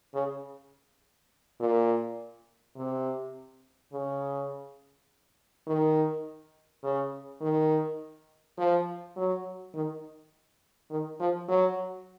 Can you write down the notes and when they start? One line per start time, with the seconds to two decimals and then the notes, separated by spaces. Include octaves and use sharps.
0.14 C#3
1.60 A#2
2.76 C3
3.92 C#3
5.67 D#3
6.83 C#3
7.41 D#3
8.58 F3
9.16 F#3
9.74 D#3
10.90 D#3
11.20 F3
11.48 F#3